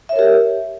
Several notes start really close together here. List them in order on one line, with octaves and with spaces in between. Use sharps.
E5 C#5 A#4 G4